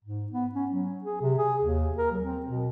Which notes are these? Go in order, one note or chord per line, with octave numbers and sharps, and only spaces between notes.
G#2
B3
C#4
F#3
G#4
C3
G#4
D#2
A#4
F#3
C4
B2